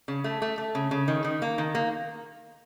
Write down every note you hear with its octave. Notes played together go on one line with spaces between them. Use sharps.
C#3
A3
A3
A3
C#3
C#3
D#3
D#3
A#3
D#3
A#3